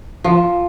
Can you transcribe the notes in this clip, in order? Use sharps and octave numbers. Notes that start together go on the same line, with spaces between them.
F3